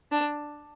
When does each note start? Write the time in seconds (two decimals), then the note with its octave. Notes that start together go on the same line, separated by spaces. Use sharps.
0.11 D4